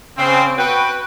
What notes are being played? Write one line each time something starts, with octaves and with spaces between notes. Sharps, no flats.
C#3 C4
F#4 B4 G5